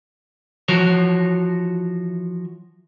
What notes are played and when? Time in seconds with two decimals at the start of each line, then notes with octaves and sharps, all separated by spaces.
0.68 E3 F3 F#4 C#5